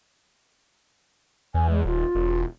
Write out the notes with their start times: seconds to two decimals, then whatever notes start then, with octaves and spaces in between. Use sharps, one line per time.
1.54 E2 G#5
1.70 G#3
1.85 D#1 F4
2.15 E1